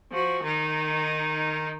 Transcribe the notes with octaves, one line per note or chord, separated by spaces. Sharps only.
F3 F#4
D#3 D#4